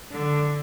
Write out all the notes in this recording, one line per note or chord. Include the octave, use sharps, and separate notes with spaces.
D3